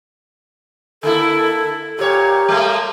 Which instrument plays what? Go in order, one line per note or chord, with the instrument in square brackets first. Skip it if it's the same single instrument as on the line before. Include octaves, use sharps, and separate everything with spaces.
[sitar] D3 A#3 E4 [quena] A4
[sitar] A#2 C#5 [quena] G4
[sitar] G3 A3 A#3